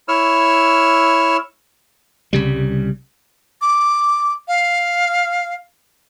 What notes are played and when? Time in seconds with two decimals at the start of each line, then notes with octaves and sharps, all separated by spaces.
0.08 E4 C#5 E6 F6
2.33 C2 C#3 G3
3.61 D6
4.48 F5